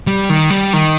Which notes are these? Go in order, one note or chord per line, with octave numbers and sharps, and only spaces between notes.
G3
D#3
G3
D#3